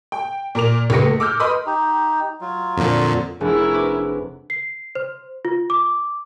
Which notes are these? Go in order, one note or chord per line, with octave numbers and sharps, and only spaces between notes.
G5
A#2 A#4 D6 F7
C#2 A#3 G4 B4 A#6 C#7
A3
D6 E6 F6 G6
B4 D#5 B5 C6 D6 D#6
D#4 G4
F#3 F4
F2 A#2 D3
F1 C#4 D4 E4 G#4 A#4
B4 B5 D6
C7
C5
F4
D6